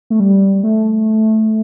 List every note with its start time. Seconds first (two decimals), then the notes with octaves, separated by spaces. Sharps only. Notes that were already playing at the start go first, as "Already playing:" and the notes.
0.10 A3
0.20 G3
0.63 A3